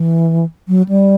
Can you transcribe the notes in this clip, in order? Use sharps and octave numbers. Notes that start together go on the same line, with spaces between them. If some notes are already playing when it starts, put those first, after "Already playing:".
Already playing: E3
F#3
G3